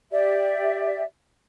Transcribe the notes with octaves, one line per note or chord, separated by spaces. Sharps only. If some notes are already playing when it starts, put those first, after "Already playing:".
G4 D5 E5